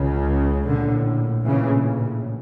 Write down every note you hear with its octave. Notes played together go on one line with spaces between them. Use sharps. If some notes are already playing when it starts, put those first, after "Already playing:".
Already playing: C#2 C#3
A#1 A2 D3
A#1 A2 C#3 E3